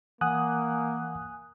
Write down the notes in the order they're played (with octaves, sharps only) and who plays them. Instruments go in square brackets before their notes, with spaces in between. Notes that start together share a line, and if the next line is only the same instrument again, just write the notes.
[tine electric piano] E3 F#5 [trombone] A#3 [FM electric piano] G#5 D#6 F#6